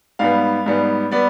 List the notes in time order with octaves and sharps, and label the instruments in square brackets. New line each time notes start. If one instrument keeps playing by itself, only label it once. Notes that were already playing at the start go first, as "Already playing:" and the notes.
[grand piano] G#2 G3 B3 F5
G#2 G3 B3
G3 B3 D5